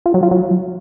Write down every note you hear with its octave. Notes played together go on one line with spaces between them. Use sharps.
F4
F#3
F4
F#3